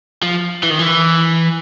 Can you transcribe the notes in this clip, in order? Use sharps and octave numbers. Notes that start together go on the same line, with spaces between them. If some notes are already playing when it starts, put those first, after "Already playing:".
F3
E3
D#3
E3